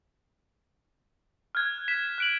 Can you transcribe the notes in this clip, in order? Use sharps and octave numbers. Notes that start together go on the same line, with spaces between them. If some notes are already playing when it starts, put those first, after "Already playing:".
F6 F#6 G#6
B6 E7
F#6 D7 F#7